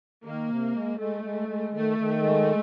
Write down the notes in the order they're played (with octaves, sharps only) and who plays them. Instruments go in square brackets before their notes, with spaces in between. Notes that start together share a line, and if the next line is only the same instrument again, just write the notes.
[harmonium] D#3 [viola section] A#3
[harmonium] C3
G#3
[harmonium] G#3 [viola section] A3
[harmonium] G#3
G#3
[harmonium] D#3 [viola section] A3
[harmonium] D#3
G#3